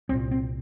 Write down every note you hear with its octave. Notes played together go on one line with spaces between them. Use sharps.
C2 A#2 C4
C4